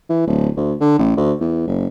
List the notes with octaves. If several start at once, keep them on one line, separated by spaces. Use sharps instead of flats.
E3
D1
D2
D3
A1
D2
E2
F#1